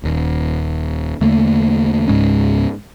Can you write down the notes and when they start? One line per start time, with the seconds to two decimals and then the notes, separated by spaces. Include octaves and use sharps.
0.03 D#1 D#2
1.21 E2 D3 A3 A#3
2.08 C#2 G#2 G#3 C#4